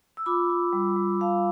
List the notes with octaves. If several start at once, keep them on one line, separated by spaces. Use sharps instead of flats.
E6
F4 B5 D6
F4
G3
G3
G3 F5 A5